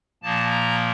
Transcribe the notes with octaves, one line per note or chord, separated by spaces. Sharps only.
A#2 F3 A#3 A5
A#5